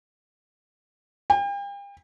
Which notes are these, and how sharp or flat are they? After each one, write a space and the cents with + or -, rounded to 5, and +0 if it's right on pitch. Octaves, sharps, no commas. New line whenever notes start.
G5 +40